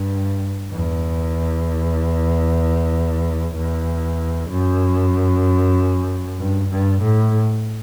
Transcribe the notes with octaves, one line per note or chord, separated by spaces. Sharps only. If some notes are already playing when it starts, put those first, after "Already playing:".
Already playing: G2
E2
E2
F#2
G2
G2
A2